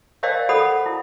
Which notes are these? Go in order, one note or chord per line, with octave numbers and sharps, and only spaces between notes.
A#4 C5 D5 D#5 F5 G5
A4 C5 F#5 B5 D#6
E4